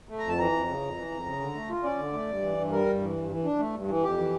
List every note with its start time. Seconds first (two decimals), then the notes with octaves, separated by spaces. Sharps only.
0.09 A3
0.19 F2 A#5
0.29 A5
0.38 E3 A#5
0.52 F2
0.68 C#3
0.82 F2
0.96 E3
1.11 F2
1.26 C#3
1.40 D3
1.55 A3
1.70 F4
1.84 C#4 D5
1.98 D3
2.13 A3
2.28 G2
2.42 E3
2.57 G2
2.72 G3 A#4
2.86 G2
3.01 E3
3.16 G2
3.31 E3
3.45 D4
3.59 A3
3.74 G2
3.88 E3
4.03 F2 G4
4.18 E3